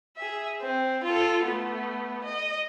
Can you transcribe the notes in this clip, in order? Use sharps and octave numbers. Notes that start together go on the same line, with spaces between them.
G#4 E5
C4
F4 A4
A3 B3
D#5